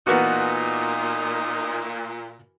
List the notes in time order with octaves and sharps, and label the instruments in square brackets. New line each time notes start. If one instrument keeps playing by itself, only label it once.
[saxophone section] A#2 [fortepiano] E3 A#3 F#4 [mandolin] B3 D5 F#5 [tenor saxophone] D#4